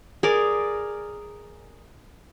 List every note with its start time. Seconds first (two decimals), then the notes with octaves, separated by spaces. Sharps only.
0.23 G#4 A#4 D5